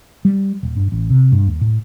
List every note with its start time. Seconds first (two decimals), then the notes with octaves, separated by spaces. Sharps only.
0.25 G3
0.63 D#1
0.77 G2
0.92 A1
1.10 C3
1.32 G2
1.47 D#2
1.61 A2